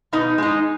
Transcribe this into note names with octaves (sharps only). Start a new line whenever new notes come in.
B2 D#4
G#3 D#4